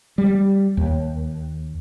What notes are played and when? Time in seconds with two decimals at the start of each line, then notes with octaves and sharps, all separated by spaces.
0.18 G3
0.77 D#2